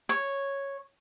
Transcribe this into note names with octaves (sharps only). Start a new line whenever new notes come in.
C#5